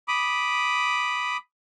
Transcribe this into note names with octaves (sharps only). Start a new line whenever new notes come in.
B5 D6 D#6